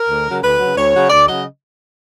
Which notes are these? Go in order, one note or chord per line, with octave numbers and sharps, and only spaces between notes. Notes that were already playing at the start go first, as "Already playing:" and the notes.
Already playing: A#4
D2
C#3 F#3
D2 B4
C#3 F#3
D2 C#5
C#3 F#3
D2 D5
C#3 F#3 D#5